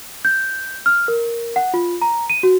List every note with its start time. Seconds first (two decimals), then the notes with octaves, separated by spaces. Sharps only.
0.25 G6
0.86 F6
1.08 A#4
1.56 F#5
1.74 F4
2.02 A#5
2.30 D#7
2.43 F#4